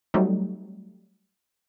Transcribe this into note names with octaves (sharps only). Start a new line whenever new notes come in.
F#3 G3 A3 C4 D#4